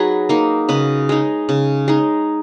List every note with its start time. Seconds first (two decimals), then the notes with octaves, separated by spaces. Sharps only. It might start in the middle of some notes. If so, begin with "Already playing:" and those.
Already playing: F#3 D#4 G#4 B4
0.29 A#3 D#4
0.69 C#3 B4 D#5
1.09 G#3 D#4
1.49 C#3
1.88 G#3 D#4